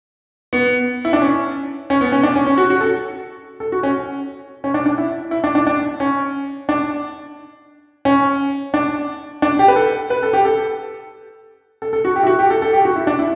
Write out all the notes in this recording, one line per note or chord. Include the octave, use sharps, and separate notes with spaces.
B3
E4
D4
C#4
C#4
B3
C#4
D4
C#4
C#4
F#4
F#4
A4
A4
F#4
C#4
C#4
D4
D4
E4
E4
D4
D4
D4
C#4
D4
C#4
D4
D4
G4
B4
A4
B4
A4
G4
A4
A4
A4
F#4
G4
E4
F#4
G4
A4
A4
G4
F#4
E4
D4
E4